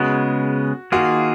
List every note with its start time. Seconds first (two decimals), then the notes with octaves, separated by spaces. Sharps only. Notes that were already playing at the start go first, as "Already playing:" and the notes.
Already playing: C#3 G#3 B3 F#4
0.92 D#3 A#3 F4 F#4 G#4